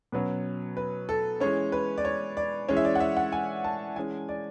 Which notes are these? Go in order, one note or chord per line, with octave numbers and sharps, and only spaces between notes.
B2 F#3 C#4 B4
B4
A4
E3 G#3 C#4 C#5
B4
D5
C#5
D5
E3 G#3 C#4 C#5
E5
D5
F#5
E5
F#5
G#5
A5
E3 G#3 C#4 G#5
D5